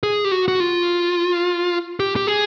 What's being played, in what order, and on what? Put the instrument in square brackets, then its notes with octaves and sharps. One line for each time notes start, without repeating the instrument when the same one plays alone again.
[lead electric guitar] G#4
G4
F#4
F#4
F4
G4
G4
G#4